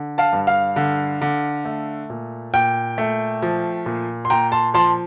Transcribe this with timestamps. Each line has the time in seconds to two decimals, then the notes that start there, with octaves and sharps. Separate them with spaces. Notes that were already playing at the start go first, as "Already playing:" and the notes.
Already playing: D3
0.18 F5 A5
0.33 G2
0.47 F5
0.76 D3
1.22 D3
1.65 A3
2.10 A#2
2.54 A#2 G5
2.98 A3
3.42 F3
3.86 A#2
4.25 C6
4.30 A#2 G5 A#5
4.52 A5 C6
4.74 F3 A5 C6